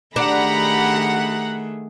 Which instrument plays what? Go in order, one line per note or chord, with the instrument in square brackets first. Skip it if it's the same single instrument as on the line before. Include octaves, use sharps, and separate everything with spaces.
[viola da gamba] D#3 A3 G#4 [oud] D4 [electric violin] G4 A#5 [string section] F#5 B5